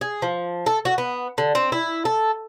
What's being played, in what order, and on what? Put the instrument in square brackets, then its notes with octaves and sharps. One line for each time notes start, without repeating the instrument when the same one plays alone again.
[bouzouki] G#4
F3
A4
F#4
B3
D3
C4
E4
A4